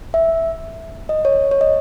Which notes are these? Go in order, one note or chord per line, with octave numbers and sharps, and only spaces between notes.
E5
D#5
C#5
C#5
D#5